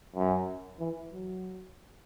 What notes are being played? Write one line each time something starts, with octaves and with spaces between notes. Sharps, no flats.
F#2
E3
F#3